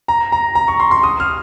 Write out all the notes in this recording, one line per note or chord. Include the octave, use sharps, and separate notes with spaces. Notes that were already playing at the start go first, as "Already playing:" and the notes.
A#5
A#5
A#5
C#6
C6
C6
D#6
F6